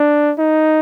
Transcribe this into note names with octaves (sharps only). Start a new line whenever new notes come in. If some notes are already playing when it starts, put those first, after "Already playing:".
Already playing: D4
D#4